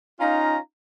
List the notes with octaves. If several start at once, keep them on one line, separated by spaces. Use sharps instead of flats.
C#4 D#4 F4 F5 A#5